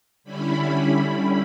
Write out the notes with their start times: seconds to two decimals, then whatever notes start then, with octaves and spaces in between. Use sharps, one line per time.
0.24 D3 G3 C#4 E4 B5
0.80 B5